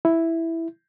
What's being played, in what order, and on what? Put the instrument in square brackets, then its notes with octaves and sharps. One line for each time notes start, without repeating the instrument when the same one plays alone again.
[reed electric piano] E4